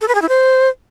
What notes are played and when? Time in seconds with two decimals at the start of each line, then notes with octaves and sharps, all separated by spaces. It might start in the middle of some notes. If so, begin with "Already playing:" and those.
0.01 A4
0.08 B4
0.15 G#4
0.22 E4
0.29 C5